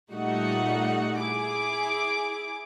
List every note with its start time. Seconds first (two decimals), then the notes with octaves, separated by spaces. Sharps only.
0.11 A#2 G3 A3 D#4 F#4 F#5
1.21 E4 G#4 D6